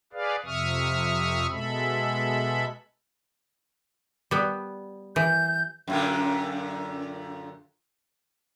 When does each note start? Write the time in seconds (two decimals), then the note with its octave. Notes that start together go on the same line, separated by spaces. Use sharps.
0.13 G#4 B4 D5 F5
0.45 F2 C3 E5 C#6 D#6 F6
1.51 B2 G#3 A4 E5 B5
4.31 G3 B3
5.16 E3 G6
5.87 F#2 A#2 D3